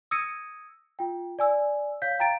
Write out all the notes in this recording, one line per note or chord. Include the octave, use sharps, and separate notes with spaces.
D#6 E6 G#6 A#6 C#7 D#7
F4 G5
D5 G#5 E6
C#5 F5 G6 B6
F5 G5 A#5 A6 D7